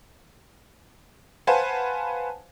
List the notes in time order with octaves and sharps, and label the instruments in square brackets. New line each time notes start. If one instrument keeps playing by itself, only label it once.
[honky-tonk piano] B4 C5 F5 F#5 G#5 A5